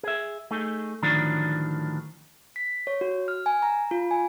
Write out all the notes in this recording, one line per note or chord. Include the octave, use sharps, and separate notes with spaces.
G#4 E5
A3 D#4 G#4
D2 A2 D#3 F3 F#3 D4
B6
C#5
F#4
F6
G#5
A#5
F4
G#5